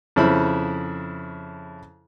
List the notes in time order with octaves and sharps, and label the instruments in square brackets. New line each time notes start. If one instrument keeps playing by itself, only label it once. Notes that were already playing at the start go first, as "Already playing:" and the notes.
[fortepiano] F2 C#3 E4 C5 B5